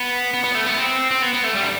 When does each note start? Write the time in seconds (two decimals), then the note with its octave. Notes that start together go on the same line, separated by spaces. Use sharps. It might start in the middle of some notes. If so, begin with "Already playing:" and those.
Already playing: B3
0.34 B3
0.44 B3
0.55 A3
0.66 B3
0.77 C4
1.11 C4
1.22 B3
1.33 B3
1.44 A3
1.55 G3
1.62 D3